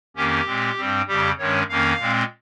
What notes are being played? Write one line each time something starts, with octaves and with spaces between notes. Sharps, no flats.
F2 D#3 A#3 C#4 G4
A#2 G#3 C4
G2 G3 C4
F2 C#3 G3 G4
G2 D#3 G#3 C#4 C#5
F2 D#3 A#3 C#4 F5
A#2 G#3 C4